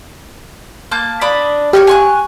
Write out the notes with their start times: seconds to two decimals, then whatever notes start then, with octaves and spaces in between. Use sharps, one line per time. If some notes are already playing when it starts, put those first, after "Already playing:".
0.91 A#3 A5 G6
1.21 D4 B5 D#6
1.73 G4 C#5 D#5 F6
1.87 G#5 C#6 F#6